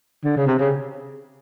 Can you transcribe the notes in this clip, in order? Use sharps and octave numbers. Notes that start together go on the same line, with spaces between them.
D3
C#3
C3
C#3